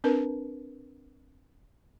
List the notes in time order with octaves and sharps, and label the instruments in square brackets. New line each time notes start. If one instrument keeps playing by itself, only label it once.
[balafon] C4 D4 A#4 B4